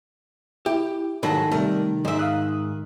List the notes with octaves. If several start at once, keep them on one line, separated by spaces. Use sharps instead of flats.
E4 G4
G#2 D#3 F#3 G#4 A4 A#5 B5
C3 G3 A3 A#4 D5
F2 G#2 D#4 C5 E5
E5 F5 D#6 F#6